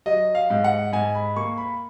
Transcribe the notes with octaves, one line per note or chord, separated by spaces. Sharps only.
F#3 D#5
F5
G#2
F#5
G#2 G#5
B5
A#3 C#6
B5